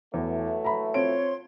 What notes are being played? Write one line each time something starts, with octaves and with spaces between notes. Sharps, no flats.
E2 E3 F#3 A3
A#5 B5
C4 F4 C#5 C6 D7